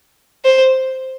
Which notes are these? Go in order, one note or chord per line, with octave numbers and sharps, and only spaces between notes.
C5